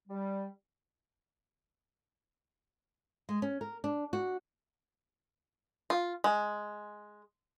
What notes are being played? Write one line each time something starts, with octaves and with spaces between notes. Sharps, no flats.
G3
G#3
C#4
A#4
D4
F#4
F4
G#3